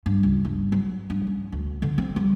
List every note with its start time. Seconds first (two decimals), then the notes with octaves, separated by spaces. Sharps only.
0.06 G2
0.23 C#2
0.45 G1
0.72 F#3
1.10 G2
1.27 C#4
1.52 D2
1.82 D3
1.98 C4
2.16 G3